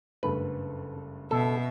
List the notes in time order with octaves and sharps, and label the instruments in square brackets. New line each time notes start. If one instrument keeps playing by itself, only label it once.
[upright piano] F#1 G2 A3 [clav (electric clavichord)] B4
[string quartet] B2 E5 [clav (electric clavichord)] A4